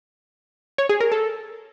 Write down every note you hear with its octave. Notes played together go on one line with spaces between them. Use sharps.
C#5
G#4
A#4
A4